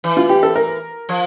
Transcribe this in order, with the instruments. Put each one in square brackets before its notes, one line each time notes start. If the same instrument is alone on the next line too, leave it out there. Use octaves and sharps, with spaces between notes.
[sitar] E3
[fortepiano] F4
G4
A4
A#4
[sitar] F3